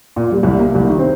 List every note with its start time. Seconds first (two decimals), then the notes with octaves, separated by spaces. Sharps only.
0.16 A#2
0.32 G3
0.43 C2
0.59 A#3
0.75 C2
0.87 D#3
0.99 C4